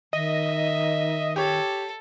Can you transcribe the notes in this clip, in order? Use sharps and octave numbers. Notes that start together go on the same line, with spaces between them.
D#3 D#5 E5
G4 A4 C#5